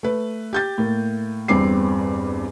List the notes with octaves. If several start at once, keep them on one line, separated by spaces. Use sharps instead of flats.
A3 B4
G4 G6 A6
A2 A#3
G1 E2 G2 C4 D6 C7